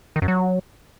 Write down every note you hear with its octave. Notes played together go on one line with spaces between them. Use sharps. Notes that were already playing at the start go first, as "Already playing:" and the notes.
D#3
F#2
F#3